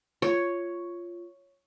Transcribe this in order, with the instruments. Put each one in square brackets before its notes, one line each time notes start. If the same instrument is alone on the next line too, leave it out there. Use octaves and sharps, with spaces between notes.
[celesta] F4 [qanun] C#5